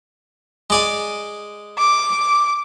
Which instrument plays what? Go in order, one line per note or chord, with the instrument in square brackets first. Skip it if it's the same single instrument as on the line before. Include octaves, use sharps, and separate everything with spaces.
[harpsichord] G#3 D5 G#5
[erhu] D6